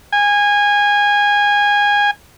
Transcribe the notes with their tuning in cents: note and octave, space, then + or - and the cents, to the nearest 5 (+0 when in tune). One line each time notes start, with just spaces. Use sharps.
G#5 -20